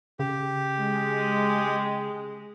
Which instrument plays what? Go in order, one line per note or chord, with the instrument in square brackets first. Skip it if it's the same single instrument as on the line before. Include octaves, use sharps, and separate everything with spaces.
[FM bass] C#3 [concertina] G4
[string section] G#3